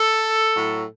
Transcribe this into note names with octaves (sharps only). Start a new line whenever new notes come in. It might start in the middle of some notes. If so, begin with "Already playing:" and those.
Already playing: A4
A2 F#3